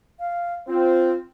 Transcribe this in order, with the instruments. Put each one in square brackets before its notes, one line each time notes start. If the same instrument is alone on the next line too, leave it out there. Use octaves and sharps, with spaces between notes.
[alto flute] F5
[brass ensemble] C4 [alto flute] F4